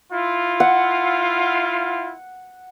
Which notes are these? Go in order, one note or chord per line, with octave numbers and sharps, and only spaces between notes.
E4 F4
F#5